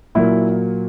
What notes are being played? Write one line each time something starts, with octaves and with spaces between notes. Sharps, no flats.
A#2 F#3 A#3 E4